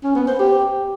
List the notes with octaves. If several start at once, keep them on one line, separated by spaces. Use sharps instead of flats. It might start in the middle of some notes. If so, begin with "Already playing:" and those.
C#4
B3
C5
G4